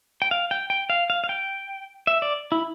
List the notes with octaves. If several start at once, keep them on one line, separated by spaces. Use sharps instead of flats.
G5
F5
G5
G5
F5
F5
F5
G5
E5
D5
E4